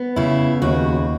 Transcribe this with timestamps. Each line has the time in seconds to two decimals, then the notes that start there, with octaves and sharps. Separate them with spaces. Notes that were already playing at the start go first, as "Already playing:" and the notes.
Already playing: B3
0.16 C#3 E4
0.62 D#2 F#4